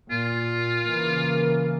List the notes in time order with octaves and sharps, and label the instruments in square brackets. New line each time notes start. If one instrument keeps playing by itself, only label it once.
[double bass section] A#2 [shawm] F4
[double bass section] C#3 E3 A#3